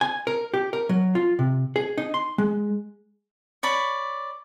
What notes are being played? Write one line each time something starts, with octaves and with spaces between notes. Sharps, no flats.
G#5
A#4
G4
A#4
F#3
F4
C3
G#4
D#4
C6
G#3
C#5 D5 B5